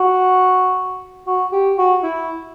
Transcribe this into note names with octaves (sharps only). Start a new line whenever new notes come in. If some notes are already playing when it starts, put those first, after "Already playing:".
Already playing: F#4
F#4
G4
F#4
E4